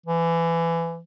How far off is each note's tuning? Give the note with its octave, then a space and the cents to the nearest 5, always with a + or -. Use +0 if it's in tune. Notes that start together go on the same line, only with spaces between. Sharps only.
E3 +20